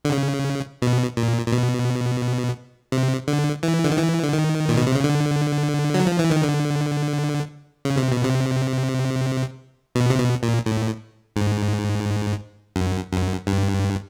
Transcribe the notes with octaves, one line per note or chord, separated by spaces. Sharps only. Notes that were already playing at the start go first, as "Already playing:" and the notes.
D3
C#3
B2
A#2
A#2
B2
C3
D3
E3
D3
D#3
E3
D3
D#3
A#2
B2
C3
C#3
D3
F#3
F3
E3
D#3
D3
C#3
C3
B2
C3
B2
C3
B2
A#2
A2
G#2
F#2
F#2
G2